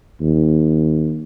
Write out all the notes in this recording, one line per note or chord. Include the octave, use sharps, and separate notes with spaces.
D#2